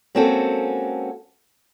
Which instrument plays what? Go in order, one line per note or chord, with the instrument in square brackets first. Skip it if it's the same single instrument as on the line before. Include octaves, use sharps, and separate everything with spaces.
[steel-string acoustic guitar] G#3 A#3 C4 C#4 F#4 A4